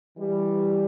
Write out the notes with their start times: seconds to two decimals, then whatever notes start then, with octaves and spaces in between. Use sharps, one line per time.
0.18 E3 G3